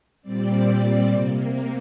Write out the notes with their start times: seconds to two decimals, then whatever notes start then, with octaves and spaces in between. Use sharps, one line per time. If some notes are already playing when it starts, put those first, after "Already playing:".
0.22 A#2 G3 C4 D5
1.10 C3 A#3